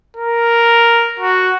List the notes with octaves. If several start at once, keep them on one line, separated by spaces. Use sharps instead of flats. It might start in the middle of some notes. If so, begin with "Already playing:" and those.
A#4
F#4